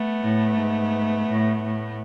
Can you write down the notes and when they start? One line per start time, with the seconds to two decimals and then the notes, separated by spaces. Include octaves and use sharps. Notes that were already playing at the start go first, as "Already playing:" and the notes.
Already playing: A3 B3
0.22 A2
0.57 G#2
1.28 A2
1.62 A2